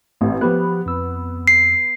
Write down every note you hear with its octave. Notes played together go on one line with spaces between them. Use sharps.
A1 C4
F3 B3 G4 F#6
F2 E6
C7